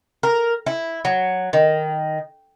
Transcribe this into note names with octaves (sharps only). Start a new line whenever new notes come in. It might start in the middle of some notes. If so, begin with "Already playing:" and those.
A#4
E4
F#3
D#3